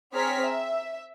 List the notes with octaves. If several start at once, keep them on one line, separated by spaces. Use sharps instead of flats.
C4 G#4 C#5 A#5 F6 B6
E5